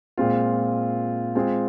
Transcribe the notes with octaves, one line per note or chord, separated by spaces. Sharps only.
A#2 G#3 C4 F4
G#3 C4 F4 G#4